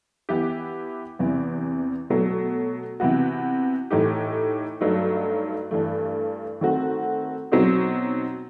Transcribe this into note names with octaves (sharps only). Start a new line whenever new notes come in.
E3 B3 E4 G4
E2 C3 E3
B2 F#3 A3
C3 E3 B3 F#4
A2 E3 A3 D#4 G4
G2 F#3 A3 D#4
G2 E3 A3
D#3 A3 C4 F#4
B2 F#3 C4 D#4